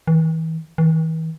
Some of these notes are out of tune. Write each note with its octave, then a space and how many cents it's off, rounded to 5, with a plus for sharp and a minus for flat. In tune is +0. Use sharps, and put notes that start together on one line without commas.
E3 -40
E3 -45